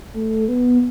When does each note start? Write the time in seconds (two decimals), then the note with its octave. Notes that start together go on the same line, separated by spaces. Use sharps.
0.14 A3
0.48 B3